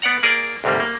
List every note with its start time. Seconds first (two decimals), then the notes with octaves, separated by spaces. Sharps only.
0.02 B3 D5 F#5 A#5
0.23 A#3 G#4 A#4 D5
0.64 D2 G#2 C3 G3 A#3
0.80 A#3